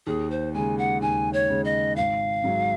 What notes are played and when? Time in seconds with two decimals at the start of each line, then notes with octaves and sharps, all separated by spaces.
0.07 D#2 G#4
0.31 C5
0.54 C#3 G#3 G#5
0.78 F#5
1.02 D#2 G#5
1.33 C#5
1.50 C#3 G#3
1.65 D#5
1.96 G#1 F5
2.44 G#2 F#3